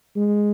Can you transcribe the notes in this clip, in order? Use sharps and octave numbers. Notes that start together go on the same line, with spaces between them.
G#3